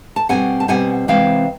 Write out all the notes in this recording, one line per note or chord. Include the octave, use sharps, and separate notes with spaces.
A5
B2 G3 C4 F#5 G#5
A5
B2 G3 C4 F#5 G#5
C3 E3 G#3 C4 F5 G5